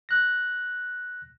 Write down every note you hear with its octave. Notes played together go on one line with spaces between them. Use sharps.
F#6 A#6